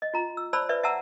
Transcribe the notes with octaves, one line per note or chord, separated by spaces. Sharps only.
D#5
F4 A#5
E6
C5 D5 A5 B5 E6
B4 D5 E5
E5 F#5 A5 A#5 E6